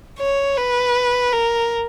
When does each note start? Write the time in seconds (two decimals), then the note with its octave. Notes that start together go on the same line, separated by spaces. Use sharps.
0.19 C#5
0.57 B4
1.32 A#4